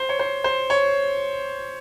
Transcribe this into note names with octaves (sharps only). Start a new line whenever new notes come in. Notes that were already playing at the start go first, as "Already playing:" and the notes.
Already playing: C5
C#5
C5
C5
C#5